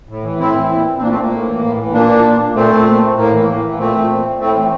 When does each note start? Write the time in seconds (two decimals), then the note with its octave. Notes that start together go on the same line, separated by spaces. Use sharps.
0.09 A2
0.24 E3
0.39 A2 C4 E4
0.55 E3
0.71 A#2
0.97 C4
1.01 A#2 A#3 D4
1.11 A3 C4
1.21 A#3
1.31 A2
1.47 E3
1.63 A2
1.78 E3
1.93 A#2 A#3 D4
2.24 A#2
2.55 A#2 A3 C4
2.86 A#2
3.17 A2 A#3
3.33 E3
3.48 A2
3.63 E3
3.78 A#2 A3 C4
4.09 A#2
4.40 A2 A3 C4
4.56 E3